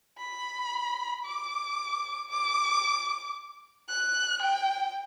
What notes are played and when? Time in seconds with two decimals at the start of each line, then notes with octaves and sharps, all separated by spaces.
0.18 B5
1.24 D6
2.29 D6
3.89 F#6
4.42 G5